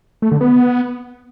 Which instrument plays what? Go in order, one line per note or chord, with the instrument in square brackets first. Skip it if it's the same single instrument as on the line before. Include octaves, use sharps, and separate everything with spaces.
[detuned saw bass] A3
D3
B3